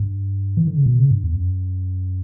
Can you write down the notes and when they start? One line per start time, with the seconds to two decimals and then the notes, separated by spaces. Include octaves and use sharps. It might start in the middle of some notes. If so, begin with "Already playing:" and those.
Already playing: G2
0.57 E3
0.67 D3
0.77 C#3
0.86 B2
0.99 C#3
1.11 G2
1.23 E2
1.36 F#2